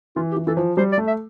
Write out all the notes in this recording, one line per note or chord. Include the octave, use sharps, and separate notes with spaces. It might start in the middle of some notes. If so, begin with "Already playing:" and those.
E3 F4
G4
E3
E3 A4
F3
G3 C5
D5
A3
E5